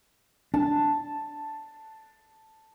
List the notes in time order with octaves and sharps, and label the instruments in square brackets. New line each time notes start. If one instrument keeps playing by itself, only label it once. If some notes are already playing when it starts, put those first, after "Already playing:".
[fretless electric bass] D4 [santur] A5